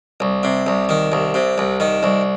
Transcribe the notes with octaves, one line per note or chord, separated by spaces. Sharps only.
C2
C3
C2
D#3
C2
C3
C2
D#3
C2